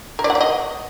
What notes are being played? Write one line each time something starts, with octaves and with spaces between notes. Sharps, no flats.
A#4
D5
F#5
D5
D#5